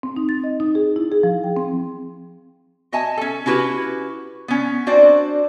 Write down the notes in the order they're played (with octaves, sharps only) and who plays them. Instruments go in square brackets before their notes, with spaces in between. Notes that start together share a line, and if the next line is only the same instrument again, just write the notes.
[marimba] C4
D#4
A6
D#5
D#4
G#4
E4
G#4
F3
G5
C4
[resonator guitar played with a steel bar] F#4 D#5 E5 G#5 A5
C#4 A4
C#4 E4 F#4 G4 B4
B3 C#4
C4 D4 F#4 C5 D5